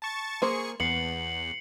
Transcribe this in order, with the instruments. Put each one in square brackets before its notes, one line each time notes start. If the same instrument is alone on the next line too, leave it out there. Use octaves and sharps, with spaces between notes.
[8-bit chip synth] A5 C#6 A6
[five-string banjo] A#3 C5 [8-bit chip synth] G#4 C#6 C#7
[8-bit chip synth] E2 [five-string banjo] B3 [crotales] C7 C#7 F#7